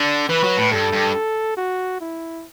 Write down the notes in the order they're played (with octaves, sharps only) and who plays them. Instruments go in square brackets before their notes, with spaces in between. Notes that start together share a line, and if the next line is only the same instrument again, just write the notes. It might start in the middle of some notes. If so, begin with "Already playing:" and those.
Already playing: [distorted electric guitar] D3 [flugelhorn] D4
[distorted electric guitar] E3 [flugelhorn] B4
[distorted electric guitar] F#3
A2
[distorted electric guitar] G2 [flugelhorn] A4
[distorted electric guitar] G2
[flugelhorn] F#4
E4